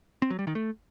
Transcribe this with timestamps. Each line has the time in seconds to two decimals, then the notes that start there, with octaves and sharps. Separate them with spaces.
0.22 C4
0.30 F#3
0.39 G3
0.47 D#3
0.55 A3